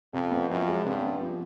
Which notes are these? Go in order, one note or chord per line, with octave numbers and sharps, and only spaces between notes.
F2 C3
B3
F#2 F3
G#3
G2 C3
B3
F3